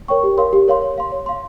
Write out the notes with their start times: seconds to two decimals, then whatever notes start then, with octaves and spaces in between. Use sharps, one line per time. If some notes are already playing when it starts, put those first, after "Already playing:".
0.08 A#4 C#5 G5 C#6
0.23 G4
0.37 A#4 C#5 F5 C6
0.53 G4
0.68 A#4 C#5 F5 C6
0.82 C#5
0.98 F5 C6
1.12 C#5
1.26 F5 C6